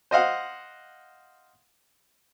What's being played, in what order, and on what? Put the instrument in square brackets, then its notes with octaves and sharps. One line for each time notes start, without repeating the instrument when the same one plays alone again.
[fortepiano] C5 D#5 F5 F#5